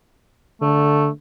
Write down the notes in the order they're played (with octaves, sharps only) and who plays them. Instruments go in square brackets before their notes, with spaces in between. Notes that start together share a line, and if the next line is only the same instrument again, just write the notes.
[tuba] D3 [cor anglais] A3